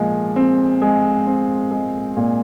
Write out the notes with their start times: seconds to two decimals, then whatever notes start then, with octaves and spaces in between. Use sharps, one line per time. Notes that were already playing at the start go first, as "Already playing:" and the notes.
Already playing: A#2 F3 G#3
0.36 C4
0.82 G#3
1.27 C4
1.71 G#3
2.17 A#2